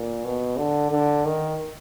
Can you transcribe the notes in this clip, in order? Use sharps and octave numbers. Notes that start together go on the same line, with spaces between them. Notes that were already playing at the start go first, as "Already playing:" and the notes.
Already playing: A#2
B2
D3
D3
D#3